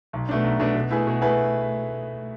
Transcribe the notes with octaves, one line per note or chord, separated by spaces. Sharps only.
B1
B2 A3 D4
B1
B2 A3 D4
B2
A3 E4 G#4 B4
B2
A3 E4 G#4 B4